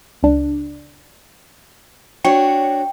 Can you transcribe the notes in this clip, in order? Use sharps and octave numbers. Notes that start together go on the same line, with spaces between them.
C#2 D4
D4 F#4 C#5 G5 C#6